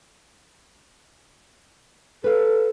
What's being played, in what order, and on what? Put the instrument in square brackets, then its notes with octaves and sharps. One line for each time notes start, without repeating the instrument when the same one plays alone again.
[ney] A4 [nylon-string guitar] B4 F5